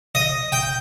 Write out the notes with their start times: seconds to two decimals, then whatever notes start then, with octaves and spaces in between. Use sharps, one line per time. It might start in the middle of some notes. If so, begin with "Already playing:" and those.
0.15 D#5
0.52 G5